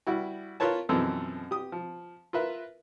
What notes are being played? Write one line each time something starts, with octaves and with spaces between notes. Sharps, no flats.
G3 E4 F#4
F4 A#4 B4 C#5 A5
F#2 B2 E3 F3 C4 A4
G4 D#6
F3
F4 A#4 B4 E5